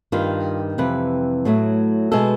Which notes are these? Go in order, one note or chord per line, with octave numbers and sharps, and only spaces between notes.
G2 D#3 G3 F4
F2 C3 E3 G3 B4
A2 F#3 A3
B2 G#3 A4